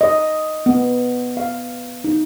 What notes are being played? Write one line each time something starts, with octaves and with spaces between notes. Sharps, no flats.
D#5
B3
F5
D#4